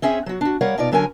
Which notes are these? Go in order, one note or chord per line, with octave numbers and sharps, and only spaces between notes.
C4 C#4 G#4 E5
F#3 F#4
D4 F#4
G3 A#4 C#5 F5 F#5
B2 D#4 F4 D5
D3 F#3 C#4 A#4 G#5